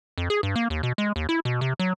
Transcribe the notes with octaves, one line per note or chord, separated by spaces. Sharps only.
F2
G#4
G2
A#3
D#2
B2
G#3
D#2
E4
B2
C3
F#3